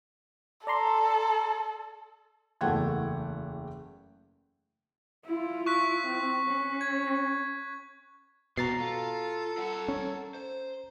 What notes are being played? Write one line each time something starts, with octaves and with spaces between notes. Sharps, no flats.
A4 D5 A#5 C6
F#1 E2 A3 F#5 G5 G#6
E4 F4
C#6 F#6 B6
C4
C#4
G#6
G#2 B2 F#4 A#5 A6 C7
F4 A4
A#4 F#5
C#4
C5